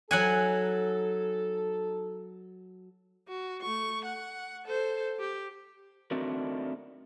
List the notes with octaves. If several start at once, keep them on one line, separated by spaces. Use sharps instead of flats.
F#3 D#4 A4 F#5 G#5
F#4
A3 C#6
F#5
A4 C5
G4
A3 C4 D4 D#4 F#4 A#4